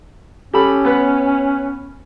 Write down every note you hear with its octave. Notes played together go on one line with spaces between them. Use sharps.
C#4 G4 A4 B5
B3 B4